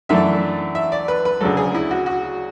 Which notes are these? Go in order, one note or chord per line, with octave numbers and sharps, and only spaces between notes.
F#2 E3 A3 D4 E5
E5
D5
B4
B4
D2 C#3 F#3 A4
G#4
E4
F#4
F#4